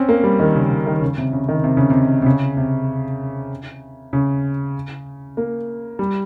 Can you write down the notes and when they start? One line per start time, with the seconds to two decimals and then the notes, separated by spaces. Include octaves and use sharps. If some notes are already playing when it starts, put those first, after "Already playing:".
Already playing: C4 C#4
0.09 A#3
0.24 G3
0.40 D#3
0.55 C#3
0.71 C#3
0.87 D#3
1.02 C#3
1.18 C3
1.33 C#3
1.49 D#3
1.64 C3
1.77 C#3
1.90 C3
2.22 C3
2.26 C#3
2.57 C3
4.13 C#3
5.37 A#3
5.99 G3